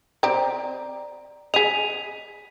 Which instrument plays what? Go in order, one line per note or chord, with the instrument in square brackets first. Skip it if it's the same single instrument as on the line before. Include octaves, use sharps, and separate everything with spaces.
[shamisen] C4 G4 [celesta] D5 A#5
[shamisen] G#4 D#5 [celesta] B6 D#7 F7